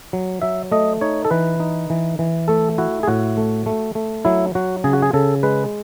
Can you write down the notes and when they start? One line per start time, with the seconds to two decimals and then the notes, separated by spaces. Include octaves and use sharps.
0.13 F#3
0.42 F#3 E5
0.72 A3 D#5
1.01 D#4 C#5
1.25 A4
1.31 E3 B4
1.60 D#4
1.90 E3
2.19 E3
2.48 A3 A4
2.78 E4 F#4
3.03 G#4
3.08 A2 F#4
3.37 A3
3.66 A3
3.95 A3
4.25 F#3 E4
4.55 F#3 F#4
4.84 C#3 G#4
4.93 F#4
5.02 G#4
5.13 C#3 A4
5.43 G#3 B4